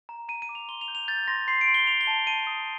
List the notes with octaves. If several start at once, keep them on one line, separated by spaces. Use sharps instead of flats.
A#5
A#5 D#7
D#7
D6
F7
C6 G7
F7
G6
F7
G6 A6
C6 A#6
C6 C7
D7
C6
G7
C6 F7
G7
A5
A5 D#7
D#6